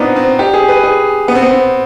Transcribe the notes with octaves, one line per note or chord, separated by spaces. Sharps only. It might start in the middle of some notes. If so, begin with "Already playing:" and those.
Already playing: B3 C4 D4 D#4 F4
C4
G4
G#4
B4
G#4
B3
C4
B3
C4